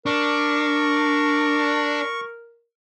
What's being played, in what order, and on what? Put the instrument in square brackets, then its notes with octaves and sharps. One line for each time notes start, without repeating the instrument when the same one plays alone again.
[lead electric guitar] D4 [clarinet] A#4 [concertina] C#6